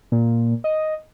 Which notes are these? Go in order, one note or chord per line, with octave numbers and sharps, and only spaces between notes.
A#2
D#5